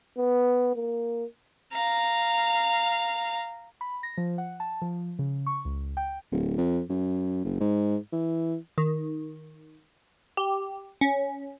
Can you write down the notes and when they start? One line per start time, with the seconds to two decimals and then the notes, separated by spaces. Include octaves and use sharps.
0.18 B3
0.75 A#3
1.74 F5 A#5
3.81 B5
4.03 A#6
4.18 F3
4.38 F#5
4.60 A5
4.82 F3
5.19 C#3
5.46 C#6
5.65 C#2
5.97 G5
6.32 D1
6.58 F2
6.89 F#2
7.44 F#1
7.60 G#2
8.12 E3
8.78 D#3
10.37 G4
11.01 C#4